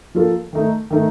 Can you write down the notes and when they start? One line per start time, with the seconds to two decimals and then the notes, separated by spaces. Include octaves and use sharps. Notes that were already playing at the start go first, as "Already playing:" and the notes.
0.15 F3 A#3 F4 A4
0.53 D#3 A3 D#4
0.91 D#3 A3 D#4